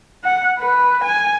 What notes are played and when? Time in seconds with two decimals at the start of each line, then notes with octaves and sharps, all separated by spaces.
0.24 F#5
0.59 B4
1.04 G#5